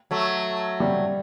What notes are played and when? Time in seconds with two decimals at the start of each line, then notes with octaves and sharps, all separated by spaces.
0.11 F#3 A3
0.80 G3